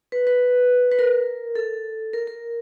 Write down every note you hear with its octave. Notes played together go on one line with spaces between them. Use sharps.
B4
B4
B4
A#4
A4
A#4
A#4